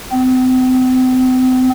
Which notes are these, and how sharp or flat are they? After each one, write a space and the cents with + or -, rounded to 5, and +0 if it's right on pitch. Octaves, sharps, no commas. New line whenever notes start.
C4 -35